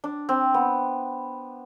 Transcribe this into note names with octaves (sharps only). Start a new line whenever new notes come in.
D4
C4
B3